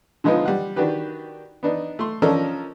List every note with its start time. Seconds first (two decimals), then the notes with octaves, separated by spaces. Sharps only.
0.24 D3 F3 G#3 B3 D#4 F4
0.45 G3 F#5
0.76 D#3 D4 F#4 G4 B4
1.63 B3 D4 D#4
1.99 A3 C6
2.22 F3 C#4 D4 A4 A#4 D#5